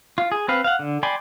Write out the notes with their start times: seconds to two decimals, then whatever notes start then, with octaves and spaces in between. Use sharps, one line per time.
0.18 F4
0.32 G#4
0.48 C4 B4 F5
0.64 F5 F#5
0.79 D3
1.03 D5 G5 G#5 B5 C6